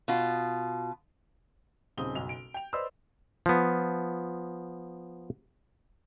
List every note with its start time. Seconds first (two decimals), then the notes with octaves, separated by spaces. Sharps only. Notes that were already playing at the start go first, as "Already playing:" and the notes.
0.08 B2 F4
1.97 D#1 C#3 C4 D#4 D#6 G7
2.15 F#1 B1 F7
2.29 D7
2.54 G5 F7
2.73 B4 C5 D5 D#5 C6 E6
3.46 F3 B3